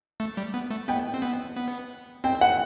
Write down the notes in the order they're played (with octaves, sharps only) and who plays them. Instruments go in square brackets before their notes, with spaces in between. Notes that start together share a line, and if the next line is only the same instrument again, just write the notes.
[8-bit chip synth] A3
G3
B3
A3
[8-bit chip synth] B3 [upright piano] G5
[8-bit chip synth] C4
B3
B3
[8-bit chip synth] C4 [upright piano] G5
[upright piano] F#5